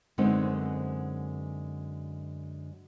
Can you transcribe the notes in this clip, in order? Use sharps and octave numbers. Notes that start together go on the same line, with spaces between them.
F#2 D3 G#3 B3 C4 D#4